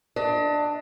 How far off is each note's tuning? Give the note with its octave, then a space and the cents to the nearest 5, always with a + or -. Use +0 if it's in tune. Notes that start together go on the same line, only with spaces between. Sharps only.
D4 +15 D#5 +35